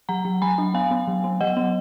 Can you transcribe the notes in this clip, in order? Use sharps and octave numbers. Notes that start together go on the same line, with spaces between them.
F#3 F#5 A#5
F#3
F#3 G#5 B5
D4
B3 F5 G#5
B3
F#3
B3
F#3 D#5 F#5
B3